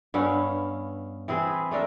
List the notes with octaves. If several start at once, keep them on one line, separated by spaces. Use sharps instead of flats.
G2 B3 C#4 F5
E3 C4 G#4 B4
A3 D4 A#4 E5